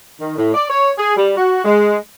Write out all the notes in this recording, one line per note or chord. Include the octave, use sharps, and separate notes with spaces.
D#3
A2
D5
C#5
G#4
G3
F#4
G#3